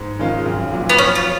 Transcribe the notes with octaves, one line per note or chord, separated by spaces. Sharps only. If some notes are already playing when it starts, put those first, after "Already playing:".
Already playing: G#2
D#3 G#3 C#4 F4
B1
A#2 F#3
B3
F2 C#4
F4